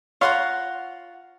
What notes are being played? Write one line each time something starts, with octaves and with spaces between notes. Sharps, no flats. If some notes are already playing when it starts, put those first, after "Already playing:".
F4 C#5 F5 F#5 A#5 C6